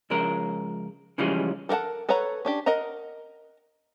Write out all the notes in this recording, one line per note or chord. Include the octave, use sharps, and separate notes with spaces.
C#2 F3 G#3 C#4 A#4
C#3 E3 F3 G3 G#3 C#4
A4 A#4 C5 F#5 A5
A4 B4 C#5 F#5 A#5
C#4 D4 G4
A#4 D#5 F#5 A#5